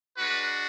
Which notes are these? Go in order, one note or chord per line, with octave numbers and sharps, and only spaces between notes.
G#3 D4 F#4 B4